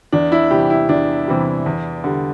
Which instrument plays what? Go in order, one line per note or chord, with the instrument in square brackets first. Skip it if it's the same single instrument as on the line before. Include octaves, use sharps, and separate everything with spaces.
[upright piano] E2 D4
E4
C3 E3 G3 G4
E4
E2 D4
C3 E3 G3
E2
D3 G3